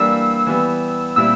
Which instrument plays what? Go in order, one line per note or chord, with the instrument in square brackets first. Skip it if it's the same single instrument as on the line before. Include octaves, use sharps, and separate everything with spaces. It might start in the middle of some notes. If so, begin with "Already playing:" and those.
Already playing: [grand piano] E3 G3 A#3 D4 [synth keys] E6
[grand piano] E3 G3 B3
[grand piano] A#2 G3 C4 E4 [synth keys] E6